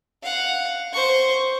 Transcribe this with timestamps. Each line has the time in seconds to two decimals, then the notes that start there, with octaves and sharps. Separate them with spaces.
0.23 F5 F#5
0.93 C5 C#6